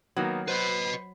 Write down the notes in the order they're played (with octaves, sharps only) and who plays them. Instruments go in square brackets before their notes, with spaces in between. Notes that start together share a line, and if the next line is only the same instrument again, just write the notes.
[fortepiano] D#3 A#3 B3 [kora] F#3
[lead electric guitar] B4 D#5 [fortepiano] C5 [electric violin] B5 C7